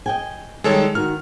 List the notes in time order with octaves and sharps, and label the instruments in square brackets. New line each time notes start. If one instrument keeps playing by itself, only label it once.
[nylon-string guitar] D#5 G5 G#5
[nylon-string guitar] D#3 G3 [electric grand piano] G#3 A4 C#5
[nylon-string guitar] D#3 F#4 [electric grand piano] F6